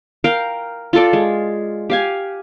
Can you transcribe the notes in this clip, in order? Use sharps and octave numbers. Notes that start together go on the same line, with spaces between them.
A#4 F5 G5
F4 A4 D5
G#3
G4 F5 G#5